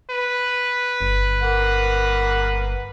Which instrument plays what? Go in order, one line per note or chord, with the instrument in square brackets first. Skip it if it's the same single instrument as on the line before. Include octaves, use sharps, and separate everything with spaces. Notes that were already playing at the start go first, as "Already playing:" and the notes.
[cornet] B4
[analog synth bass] G1
[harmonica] A#3 F#5